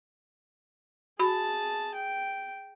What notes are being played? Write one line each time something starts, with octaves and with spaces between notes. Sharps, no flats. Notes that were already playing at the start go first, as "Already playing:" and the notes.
F#4 G#4 A5 B5
G5